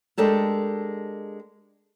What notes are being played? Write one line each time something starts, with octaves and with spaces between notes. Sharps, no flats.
G#3 D4 G4 A4 A#4